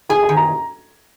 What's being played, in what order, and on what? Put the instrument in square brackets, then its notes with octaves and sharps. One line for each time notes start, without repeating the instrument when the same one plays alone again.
[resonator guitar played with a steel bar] G#4 [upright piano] G#5
[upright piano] G#5
[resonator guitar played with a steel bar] D#3
[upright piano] A#5